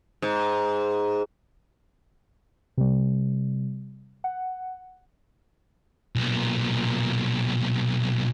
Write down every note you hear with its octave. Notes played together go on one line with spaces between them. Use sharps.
G#2
C3 G3
F#5
B1 A#2